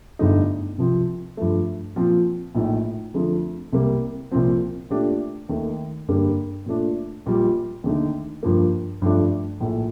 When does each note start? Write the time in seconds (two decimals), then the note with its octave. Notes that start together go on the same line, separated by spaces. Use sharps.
0.19 G1 G2 D3 A3 D#4
0.78 C2 C3 F3 C4
1.37 G2 F3 A3
1.96 A#2 F3 C4 F4
2.55 A#1 A2 A3 D#4
3.14 F2 D3 F3 A3
3.73 C2 C3 G3 A#3
4.31 C2 A#2 F3 C4
4.90 A#2 A3 D4 G4
5.49 D#2 D#3 A3
6.08 G2 D3 G3 A#3
6.66 A#2 A3 D4
7.26 A#1 A#2 G3
7.84 D#2 D3 A3 D#4
8.43 G2 F3 A#3
9.02 G2 F3 A3 D4
9.60 A#1 A2 A3